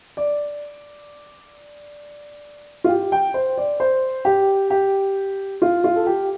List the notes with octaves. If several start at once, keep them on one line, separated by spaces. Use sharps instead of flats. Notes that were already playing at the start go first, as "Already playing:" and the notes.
D5
F4
G4
G5
C5
D5
C5
G4
G4
F4
F4
A4
G4